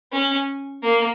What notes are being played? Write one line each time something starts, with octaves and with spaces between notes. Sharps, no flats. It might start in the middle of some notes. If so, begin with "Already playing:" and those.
C#4
A#3